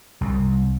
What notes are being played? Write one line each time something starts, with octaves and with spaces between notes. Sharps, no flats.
C2